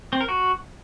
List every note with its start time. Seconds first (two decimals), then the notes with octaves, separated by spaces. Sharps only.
0.13 C4
0.21 A#4
0.29 F#4